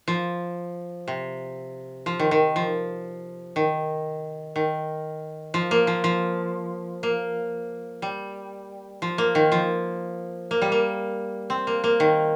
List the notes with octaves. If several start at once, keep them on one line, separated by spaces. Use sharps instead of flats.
F3
C3
F3
D#3
D#3
F3
D#3
D#3
F3
A#3
F3
F3
A#3
G3
F3
A#3
D#3
F3
A#3
G3
A#3
C4
A#3
A#3
D#3